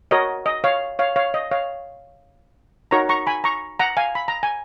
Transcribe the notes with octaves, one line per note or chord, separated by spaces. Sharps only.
F#4 A#4 C#5 D#5
D#5
C#5 F5
C#5 F5
C#5 F5
D#5
C#5 F5
D#4 F#4 A#4 C#5 A#5 C#6
A#5 C#6
G#5 B5
A#5 C#6
F#5 A#5
F5 G#5
B5
A#5
G#5